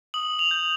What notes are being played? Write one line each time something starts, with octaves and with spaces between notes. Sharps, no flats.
D#6 F#7
F7
G6